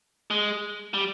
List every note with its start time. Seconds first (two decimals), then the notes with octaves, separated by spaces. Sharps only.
0.31 G#3
0.94 G3